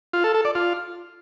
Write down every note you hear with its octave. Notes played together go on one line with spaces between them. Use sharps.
F4
A4
A4
D5
F4